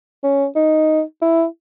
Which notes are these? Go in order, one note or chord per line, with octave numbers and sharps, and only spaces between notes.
C#4
D#4
E4